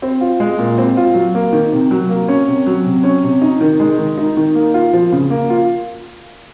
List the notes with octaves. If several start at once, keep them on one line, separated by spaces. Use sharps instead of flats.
C4
F4
G#3
A#2
C4
F4
F#3
A#3
D#3
C3
F#3
A#3
C#4
C3
F#3
C3
C#4
C3
D#4
D#3
G#3
D#3
D#4
D#3
A#3
F4
F3
C#3
A#3
F4